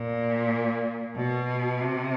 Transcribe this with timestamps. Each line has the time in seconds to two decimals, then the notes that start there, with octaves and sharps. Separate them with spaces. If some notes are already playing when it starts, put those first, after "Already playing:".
Already playing: A#2
1.16 B2
1.81 C3